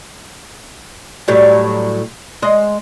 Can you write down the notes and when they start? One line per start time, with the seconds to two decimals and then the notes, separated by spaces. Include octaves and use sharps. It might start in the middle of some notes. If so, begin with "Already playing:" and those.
1.28 A2 F#3 G3
2.42 G#3 D#5